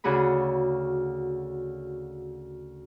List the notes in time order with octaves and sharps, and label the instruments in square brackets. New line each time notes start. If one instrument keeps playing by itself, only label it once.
[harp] D2 C#3 F#4 G#4 B5